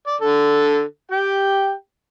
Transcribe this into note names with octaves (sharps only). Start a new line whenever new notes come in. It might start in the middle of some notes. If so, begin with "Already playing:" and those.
D5
D3 A4
G4 G5